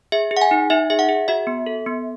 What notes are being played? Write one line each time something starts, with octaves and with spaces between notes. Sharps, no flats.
G#4 E5
G#4
F#5
G#5
D#4
D#4 E5
G#4 E5
F#5
G#4
F#4 E5
B3
A4
B3